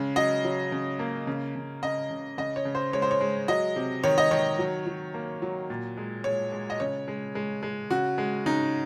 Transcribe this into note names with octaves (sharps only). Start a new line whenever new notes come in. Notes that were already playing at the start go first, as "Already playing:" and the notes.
Already playing: C#3 G#3
F#3 D#5
F#3
C#3
A#3
C#3
C#3
C#3 D#5
C#3
C#3 D#5
C#5
C#3
C5
G#3 C#5
C5
C#5
G#3
F#3 D#5
C3
D#3 C#5
D#5
D#3 C#5
F#3
F#3
A#3
F#3
A#2
G#3
G#3 C#5
G#3
D#5
C#3 C#5
G#3
G#3
G#3
C#3 F#4
G#3
C#3 D#4